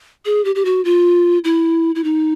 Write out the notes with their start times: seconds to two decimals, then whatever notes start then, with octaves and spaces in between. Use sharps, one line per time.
0.25 G#4
0.45 G4
0.55 G4
0.65 F#4
0.85 F4
1.44 E4
1.95 E4
2.04 D#4